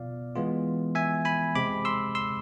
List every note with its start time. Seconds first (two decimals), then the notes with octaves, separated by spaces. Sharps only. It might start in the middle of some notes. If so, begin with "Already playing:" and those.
Already playing: B2 B3 F4 D5 F5
0.36 E3 G#3 B3 F4
0.95 E5 G#5
1.25 G#5 B5
1.55 C3 G#3 C4 B5 D6
1.85 C6 E6
2.15 C6 E6